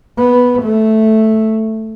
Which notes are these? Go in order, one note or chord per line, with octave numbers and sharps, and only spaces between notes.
B3
A3